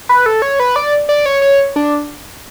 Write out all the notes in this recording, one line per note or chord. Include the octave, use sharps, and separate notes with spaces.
B4
A4
C#5
B4
D5
D5
C#5
C#5
D4